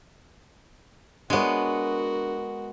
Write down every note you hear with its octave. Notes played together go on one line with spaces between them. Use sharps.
G#3 B3 D4 F#4 A#4 C#5